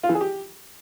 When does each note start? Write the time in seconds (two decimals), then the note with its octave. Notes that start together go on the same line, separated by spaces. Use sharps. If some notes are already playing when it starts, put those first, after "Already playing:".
0.04 F4
0.09 E3
0.15 G#4
0.21 G4